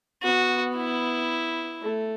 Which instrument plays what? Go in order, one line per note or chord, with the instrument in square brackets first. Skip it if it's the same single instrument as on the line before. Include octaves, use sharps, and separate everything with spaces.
[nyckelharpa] B3 [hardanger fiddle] F#4
[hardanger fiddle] E4
[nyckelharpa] A3